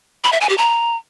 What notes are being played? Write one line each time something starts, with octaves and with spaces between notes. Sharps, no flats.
B5
E5
G#5
G4
A#5